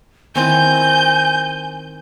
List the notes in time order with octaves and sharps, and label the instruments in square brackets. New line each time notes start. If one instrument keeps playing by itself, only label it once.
[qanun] D#3 C4 E4 [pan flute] G#5 [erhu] G6